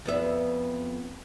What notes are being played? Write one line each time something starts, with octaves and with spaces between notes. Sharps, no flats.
F2 B3 E5